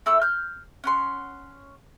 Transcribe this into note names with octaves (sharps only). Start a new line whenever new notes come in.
A3 E4 E6
F6 G6
C#4 F#5 C6